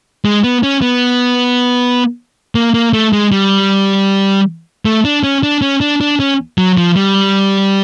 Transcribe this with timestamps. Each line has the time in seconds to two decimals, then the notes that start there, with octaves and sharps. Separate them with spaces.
0.25 G#3
0.44 B3
0.63 C#4
0.82 B3
2.55 A#3
2.74 A#3
2.93 A3
3.13 G#3
3.32 G3
4.85 A3
5.05 D4
5.24 C#4
5.43 D4
5.62 C#4
5.81 D4
6.01 D4
6.20 C#4
6.58 F#3
6.78 F3
6.96 G3